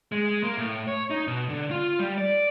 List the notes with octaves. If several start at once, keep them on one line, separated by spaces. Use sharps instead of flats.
G#3
A#3
A2
C#5
D#4
B2
D3
F4
G3
D5